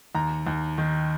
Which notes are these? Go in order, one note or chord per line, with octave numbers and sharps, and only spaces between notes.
D#2 A#5
D#2
D#3